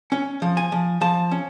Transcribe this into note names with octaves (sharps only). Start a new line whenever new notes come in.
C#4
F3
G#5
F3
F3 A5
C#4